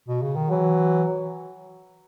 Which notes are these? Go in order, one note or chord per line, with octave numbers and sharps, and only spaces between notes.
B2
C#3
D#3
E3 F#3